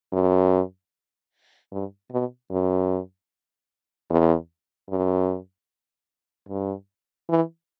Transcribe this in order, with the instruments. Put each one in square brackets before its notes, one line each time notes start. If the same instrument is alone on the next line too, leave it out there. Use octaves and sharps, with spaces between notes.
[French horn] F#2
G2
B2
F#2
E2
F#2
G2
E3